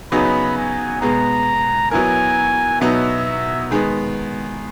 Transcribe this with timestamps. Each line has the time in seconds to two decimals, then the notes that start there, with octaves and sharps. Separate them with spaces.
0.12 C#3 F#3 B3 D#4 B5
0.57 G#5
1.02 B2 G#3 B3 A#5
1.91 F#3 B3 E4 A#4 G#5
2.81 B2 F#3 B3 D#4 E5
3.71 D#3 G#3 B3